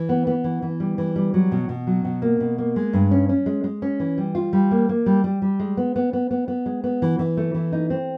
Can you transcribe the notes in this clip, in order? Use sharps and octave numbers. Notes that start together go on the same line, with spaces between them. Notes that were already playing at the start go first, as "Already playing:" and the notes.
Already playing: E3
B3
B3
E3
E3
G3
E3
G3
F#3
B2
B2
F#3
B2
A#3
B2
A#3
G#3
G2
C#4
C#4
G#3
G#3
C#4
E3
G3
F4
G3
A#3
A#3
G3
G3
G3
G#3
B3
B3
B3
B3
B3
G#3
B3
E3
E3
A3
E3
D#4
C4